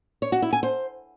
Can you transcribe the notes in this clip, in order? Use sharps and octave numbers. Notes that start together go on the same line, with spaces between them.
C#5
F#4
E4
G#5
C5